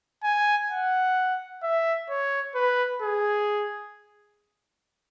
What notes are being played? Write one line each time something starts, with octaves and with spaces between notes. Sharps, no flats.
G#5
F#5
E5
C#5
B4
G#4